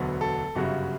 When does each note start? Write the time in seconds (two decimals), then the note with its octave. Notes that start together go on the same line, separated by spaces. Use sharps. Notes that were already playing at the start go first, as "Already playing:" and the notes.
Already playing: E1 D2 D3 F#3 B3
0.21 A4
0.55 G1 F#2 C#3 G3 F#4